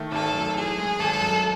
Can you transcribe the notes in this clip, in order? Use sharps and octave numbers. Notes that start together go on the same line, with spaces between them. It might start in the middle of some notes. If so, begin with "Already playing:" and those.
Already playing: D#3 A3
G#1 A4
F#2
E3 G#4
G#3
G#1 A4
F#2